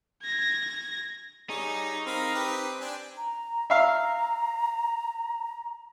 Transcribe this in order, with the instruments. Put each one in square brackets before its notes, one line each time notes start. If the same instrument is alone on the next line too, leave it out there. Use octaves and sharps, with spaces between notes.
[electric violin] G#6 A#6
[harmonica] G3 C#5 [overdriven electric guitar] D#4 [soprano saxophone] G#4
[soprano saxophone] C4 [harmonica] A#4 F5 B5
[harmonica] G4 B4
D4 G5 G#5
[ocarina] A#5
[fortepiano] E5 F5 [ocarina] A#5